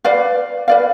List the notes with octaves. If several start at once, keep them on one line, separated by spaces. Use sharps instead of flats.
B4 D5 F5
B4 D5 F5